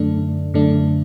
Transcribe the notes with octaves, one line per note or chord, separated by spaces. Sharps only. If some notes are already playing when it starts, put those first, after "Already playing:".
Already playing: F#2 D3 A3 D4
F#2 D3 A3 D4